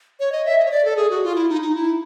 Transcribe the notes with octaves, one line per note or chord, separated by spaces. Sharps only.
C#5
D#5
E5
D#5
C#5
D5
A4
G#4
F#4
F4
E4
D#4
D#4
E4